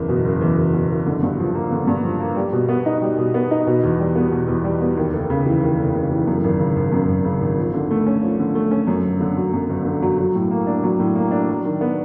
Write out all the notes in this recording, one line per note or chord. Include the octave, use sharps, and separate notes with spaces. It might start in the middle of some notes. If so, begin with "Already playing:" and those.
Already playing: F#1 E2
B2
F#1
E2
F#1
B2
F#1
D3
G2
F3
A#3
D3
G2
F3
A#3
G3
B2
B3
D#4
G3
B2
B3
D#4
B2
E2
G3
B3
B2
E2
G3
B3
D#2
F1
C#3
E3
D#2
F1
C#3
E3
F#2
G#1
C#3
G#1
F#2
G#1
C#3
G#1
F3
D3
A3
C#4
F3
D3
A3
C#4
F#2
G1
D3
F#3
F#2
G1
D3
F#3
F#3
A2
A#3
D4
F#3
A2
A#3
D4
F#3
D#3
B3